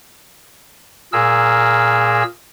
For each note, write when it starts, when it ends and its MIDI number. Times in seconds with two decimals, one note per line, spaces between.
1.13 2.23 46
1.13 2.23 68
1.13 2.23 70
1.13 2.23 88